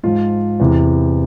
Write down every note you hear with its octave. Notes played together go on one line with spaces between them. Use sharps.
G#2 F3 F4
E2 C3 E3